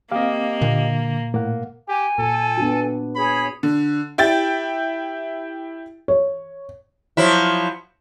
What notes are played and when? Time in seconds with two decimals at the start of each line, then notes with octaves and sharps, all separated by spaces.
0.12 A#3 C4 G4 D#5 F5
0.62 A#2 D3
1.34 A2 A#3 F#5
1.88 G4 G#5
2.18 A#2 A4
2.58 B3 D4 F#4
3.15 G#4 C#5 B5
3.63 D3
4.18 E4 G4 G5 A6
6.08 C#5
7.17 F3 F#3 E4